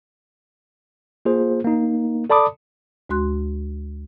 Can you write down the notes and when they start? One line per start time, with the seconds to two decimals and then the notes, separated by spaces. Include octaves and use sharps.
1.25 A#3 F4 G#4 C5
1.64 A#3 D#4
2.30 A4 D5 A5 B5 D6 D#6
3.10 D2 G#3 F#4 C6 F#6